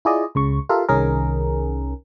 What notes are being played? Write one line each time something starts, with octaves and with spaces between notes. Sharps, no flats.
E4 F4 G#4 D5 D#5
C#2 C#3 C#6
F4 G4 A4 A#4 E5 F5
C2 D#3 C#4 G#4 A#4